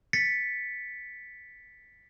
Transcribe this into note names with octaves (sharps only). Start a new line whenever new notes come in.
A6 B6 C#7